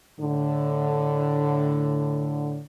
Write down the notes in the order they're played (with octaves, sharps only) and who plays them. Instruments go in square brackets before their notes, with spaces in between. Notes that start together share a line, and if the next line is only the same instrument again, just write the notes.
[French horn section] A2 D3